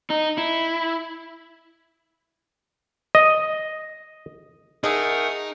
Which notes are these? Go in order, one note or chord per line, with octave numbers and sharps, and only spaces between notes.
D#4
E4
D#5
A3 D#4 G#4 A#4 D#5 F#5